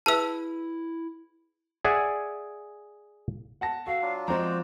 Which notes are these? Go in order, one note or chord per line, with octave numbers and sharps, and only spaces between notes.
E4 G#4 B4 E5 A5 E6
G#4 D5 E5 F#5 G#5
F#5 A5 A#6
F#4 A4 F5
F#3 D4 F4
F3 G#3 C4 F#4 C5 D5 A#5